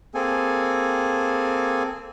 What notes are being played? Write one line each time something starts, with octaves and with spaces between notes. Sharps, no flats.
A#3 C4 G#4 A4 G#5